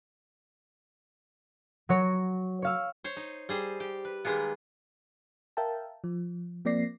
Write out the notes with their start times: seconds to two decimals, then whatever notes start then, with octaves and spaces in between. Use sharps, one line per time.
1.89 F#3 F#4 C#5
2.62 C#5 F5 E6
3.04 C5 C#5
3.16 D#4
3.49 G3 G#4 C5
3.80 G4
4.05 B4
4.25 D#3 G3 G#3 A#3 B3
5.57 A#4 E5 F5 G5 A5
6.04 F3
6.65 F3 A#3 C4 D5 A#6 C7